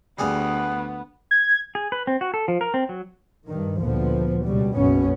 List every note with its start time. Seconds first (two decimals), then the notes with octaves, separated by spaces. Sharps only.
0.19 D2 G3 B3 G#4 F5
1.31 G#6
1.75 G#4
1.92 B4
2.07 C4
2.21 F#4
2.34 A4
2.48 F3
2.61 A#4
2.74 C4
2.89 F#3
3.47 G2 D#3
3.79 D2 A#2 F3 B3
4.45 C#2 B2 G3
4.75 F#1 B1 F#2 B2 B3 C#4